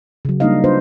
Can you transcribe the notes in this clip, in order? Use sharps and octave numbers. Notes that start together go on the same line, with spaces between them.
C#3 F#3
G3 A#3 D4 D#4 D#5 F5
D4 F4 B4 C5